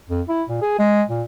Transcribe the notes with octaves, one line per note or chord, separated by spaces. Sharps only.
F2
E4
A#2
G#4
G#3
A#2